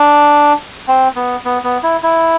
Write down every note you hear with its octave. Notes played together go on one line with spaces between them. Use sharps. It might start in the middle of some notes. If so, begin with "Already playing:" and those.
Already playing: D4
C4
B3
B3
B3
E4
E4